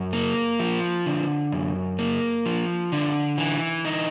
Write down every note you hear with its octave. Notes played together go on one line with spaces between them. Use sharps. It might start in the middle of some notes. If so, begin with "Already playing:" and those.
Already playing: F#2
A#3
F3
D3
F#2
A#3
F3
D3
E3
D#4